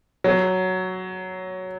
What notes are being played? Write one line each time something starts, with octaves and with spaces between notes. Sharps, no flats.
F#3